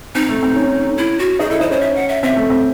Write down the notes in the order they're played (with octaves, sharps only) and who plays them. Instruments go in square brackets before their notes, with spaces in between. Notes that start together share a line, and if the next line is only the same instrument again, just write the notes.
[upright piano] C4 [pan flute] D#4
[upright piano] A3
C4
C#4
[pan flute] E4
F#4
[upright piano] D#4 [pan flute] G#4
[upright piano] E4 [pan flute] A4
[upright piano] D#4 [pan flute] C5
[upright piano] C#4 [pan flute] C5
[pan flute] E5
F#5
E5
[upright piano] C4 [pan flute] E5
[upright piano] A3
C4